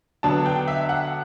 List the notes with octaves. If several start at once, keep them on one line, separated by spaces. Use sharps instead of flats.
D3 F#3 B3 D4 A5
G5
E5
F#5